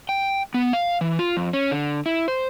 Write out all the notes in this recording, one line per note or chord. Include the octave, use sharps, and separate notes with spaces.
G5
B3
F5
E3
F4
F2
C#4
D3
E4
C5